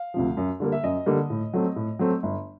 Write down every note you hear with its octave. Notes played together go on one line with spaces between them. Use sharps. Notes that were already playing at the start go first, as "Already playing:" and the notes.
Already playing: F5
D2 C3 F3
F#2
D3 G3 A#3
E5
F#2 D#5
D3 G3 A#3
A2
F#3 A3 C4
A2
F#3 A3 C4
G1